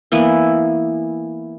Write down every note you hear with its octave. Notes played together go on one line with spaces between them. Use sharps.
E3 A#3 B3 E4